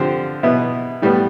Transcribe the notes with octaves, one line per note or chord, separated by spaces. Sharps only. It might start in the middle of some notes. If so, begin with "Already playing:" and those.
Already playing: D3 F3 C4 G4 C5
B2 B3 E4
A2 G3 B3